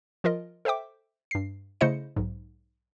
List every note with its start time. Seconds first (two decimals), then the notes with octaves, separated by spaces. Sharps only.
0.24 F3 F4 A#4 D#5
0.65 A4 C5 E5 G5 D6
1.31 G2 C7
1.81 C#3 A3 E4 C5 D#5 C#7
2.16 B1 G#2